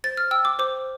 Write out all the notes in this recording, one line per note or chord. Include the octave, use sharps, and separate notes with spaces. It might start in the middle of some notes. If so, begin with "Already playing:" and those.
C5 A6
F6
G5 E6
D6
C5 D6